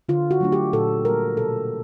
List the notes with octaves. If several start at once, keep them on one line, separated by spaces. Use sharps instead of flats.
D3 F4
F#4
F#3 A3 D4
G4
A#2 A4
G3 A#3 A#4
B2 A4